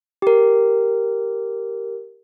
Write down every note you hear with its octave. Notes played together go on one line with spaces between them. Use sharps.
G4 A#4